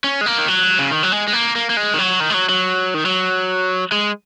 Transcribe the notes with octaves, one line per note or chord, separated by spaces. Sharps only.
C#4
G#3
A#3
D#3
F#3
C#3
D#3
F#3
G#3
G#3
A#3
A#3
A#3
G#3
D#3
F#3
D#3
G#3
F#3
F#3
D#3
F#3
G#3